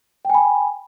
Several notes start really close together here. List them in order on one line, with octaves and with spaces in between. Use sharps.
G5 G#5 B5